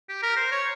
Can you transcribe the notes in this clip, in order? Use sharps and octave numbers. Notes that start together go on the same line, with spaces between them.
G4
A#4
C5
C#5